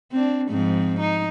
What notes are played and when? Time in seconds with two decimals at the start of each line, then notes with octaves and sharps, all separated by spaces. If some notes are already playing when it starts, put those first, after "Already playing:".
0.12 C4 D4
0.50 G#2 F3 C4
1.00 D#4